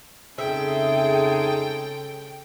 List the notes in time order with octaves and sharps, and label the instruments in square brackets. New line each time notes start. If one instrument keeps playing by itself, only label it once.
[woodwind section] F2 D#4 G#4 [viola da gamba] C#3 G#3 A4 [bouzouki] E5 [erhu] G5